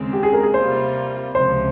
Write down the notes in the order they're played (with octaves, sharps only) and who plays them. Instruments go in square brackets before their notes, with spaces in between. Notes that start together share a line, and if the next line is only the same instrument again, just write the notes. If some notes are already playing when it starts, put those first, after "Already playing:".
Already playing: [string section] D#2 C#3 G#3 C4
[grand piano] G4
G#4
A#4
G#4
[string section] C3 G3 A#3 F4 [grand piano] C5
[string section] C#2 C3 F3 [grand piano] C5